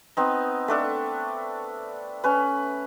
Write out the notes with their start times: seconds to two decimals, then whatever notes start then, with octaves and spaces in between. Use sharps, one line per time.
0.17 B3 C4 D#4
0.68 A3 D4 A4
2.24 C#4 B4